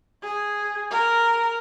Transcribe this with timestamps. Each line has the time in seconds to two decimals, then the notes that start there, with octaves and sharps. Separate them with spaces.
0.23 G#4
0.91 A#4